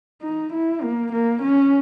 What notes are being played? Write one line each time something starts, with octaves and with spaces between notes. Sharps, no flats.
D#4
E4
A#3
A#3
C#4